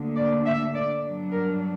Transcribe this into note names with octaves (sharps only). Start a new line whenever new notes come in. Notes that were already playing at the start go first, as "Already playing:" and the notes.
Already playing: D2 D3 A#3 D4
D5
E5
D5
G2 F#3 B3 D4
A#4